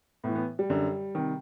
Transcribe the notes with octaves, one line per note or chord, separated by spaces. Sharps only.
A2 B3
E3
B3
G3
F#2 D3
C3 D#3